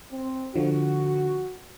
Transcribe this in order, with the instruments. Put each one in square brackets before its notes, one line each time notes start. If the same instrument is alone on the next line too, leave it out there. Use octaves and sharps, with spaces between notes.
[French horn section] C4
[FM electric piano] D3 F3 [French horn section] F#4